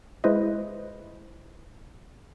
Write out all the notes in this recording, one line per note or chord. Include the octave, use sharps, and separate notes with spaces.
G#3 E4 B4 C5 D#5